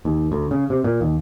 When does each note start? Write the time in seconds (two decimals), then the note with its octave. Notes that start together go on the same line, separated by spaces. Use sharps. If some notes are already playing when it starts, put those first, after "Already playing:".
0.05 D#2
0.32 D2
0.51 C#3
0.70 C3
0.84 A#2
1.01 D#2